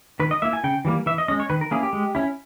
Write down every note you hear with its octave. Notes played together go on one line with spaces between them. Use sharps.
D#3 B4
D#5
A#3 E4 E5
G#5
C#3 G5
E3 G3 A#3
E3 E5
D#5
G#3 C#4 D#5
C#5
D#3 B4
A#4
A#3 C#4 E4 G#4
G4
G#3
C#4 E4